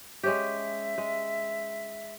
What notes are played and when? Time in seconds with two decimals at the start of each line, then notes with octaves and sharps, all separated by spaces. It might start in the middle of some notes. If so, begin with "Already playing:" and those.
0.23 G#3 C#4 G4 E5
0.98 G#3